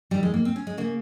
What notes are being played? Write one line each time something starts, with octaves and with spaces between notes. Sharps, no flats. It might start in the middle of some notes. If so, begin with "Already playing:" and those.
F2 D#3 G3
G#3
A#3
C4
C#4
G#3
C#3 A#3